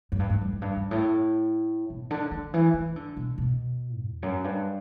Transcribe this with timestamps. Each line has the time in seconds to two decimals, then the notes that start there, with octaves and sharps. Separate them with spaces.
0.12 F#2
0.19 G2
0.30 G2
0.41 F#2
0.52 F#2
0.62 G2
0.76 G2
0.91 A2
1.90 B2
2.11 D3
2.31 D3
2.54 E3
2.74 E3
2.96 D3
3.17 B2
3.38 B2
4.01 E2
4.23 F#2
4.44 G2